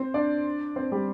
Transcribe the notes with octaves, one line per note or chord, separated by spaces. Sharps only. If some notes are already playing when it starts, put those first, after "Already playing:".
Already playing: C4 C5
D4 D5
C4 C5
G3 G4